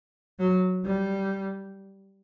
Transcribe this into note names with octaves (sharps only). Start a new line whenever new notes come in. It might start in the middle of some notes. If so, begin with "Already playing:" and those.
F#3
G3